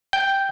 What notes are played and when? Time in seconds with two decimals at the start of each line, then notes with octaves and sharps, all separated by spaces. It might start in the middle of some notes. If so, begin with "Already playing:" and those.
0.13 G5